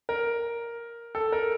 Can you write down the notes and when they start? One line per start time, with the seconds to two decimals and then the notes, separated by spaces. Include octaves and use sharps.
0.09 A#4
1.15 A4
1.32 A#4